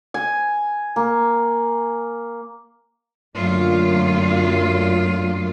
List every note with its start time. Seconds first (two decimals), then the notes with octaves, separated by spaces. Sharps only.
0.14 G#5
0.96 A#3
3.35 F#2 A#2 D3 F#3 A3 F4